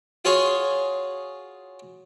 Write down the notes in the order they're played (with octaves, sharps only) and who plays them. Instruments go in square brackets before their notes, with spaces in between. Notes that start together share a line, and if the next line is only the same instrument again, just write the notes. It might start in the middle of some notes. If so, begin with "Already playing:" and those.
[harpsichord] F4 F#4 G#4 C#5 C#6